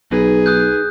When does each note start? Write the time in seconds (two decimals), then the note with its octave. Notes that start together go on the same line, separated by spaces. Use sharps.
0.11 B1 D#4 G#4 B4
0.46 D#6 F#6 G6